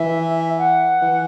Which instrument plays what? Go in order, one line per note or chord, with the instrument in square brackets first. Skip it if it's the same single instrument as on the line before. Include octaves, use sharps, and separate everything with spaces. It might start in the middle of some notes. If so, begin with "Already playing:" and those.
Already playing: [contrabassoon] E3 [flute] E5
[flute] F#5
[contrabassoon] E3